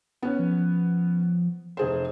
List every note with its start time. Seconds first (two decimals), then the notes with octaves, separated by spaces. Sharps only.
0.22 B3 C#4
0.39 F3
1.77 F1 G#4 C5